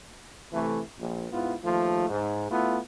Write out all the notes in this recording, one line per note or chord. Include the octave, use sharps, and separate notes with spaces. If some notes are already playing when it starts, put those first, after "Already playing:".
C3 E3 A3
A#1
G#2 B3 E4 F4
D#2 F3 A3 F4
G#2
A3 B3 E4 F4